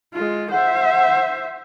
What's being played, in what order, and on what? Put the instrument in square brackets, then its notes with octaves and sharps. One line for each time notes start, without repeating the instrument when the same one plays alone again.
[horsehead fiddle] G#3 F4
[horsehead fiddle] C5 E5 [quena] F#5